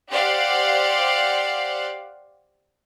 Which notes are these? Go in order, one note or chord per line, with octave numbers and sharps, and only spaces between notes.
G4 C5 D5 F5 F#5